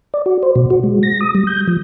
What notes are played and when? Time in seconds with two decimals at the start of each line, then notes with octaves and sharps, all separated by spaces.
0.14 D5
0.26 F#4
0.43 C5
0.56 B2
0.70 F#4
0.84 G#3
1.03 A#6
1.21 D#6
1.35 G3
1.47 G6
1.68 F3